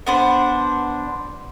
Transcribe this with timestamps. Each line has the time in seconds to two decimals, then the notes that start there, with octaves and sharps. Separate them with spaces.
0.06 B3 D4 C5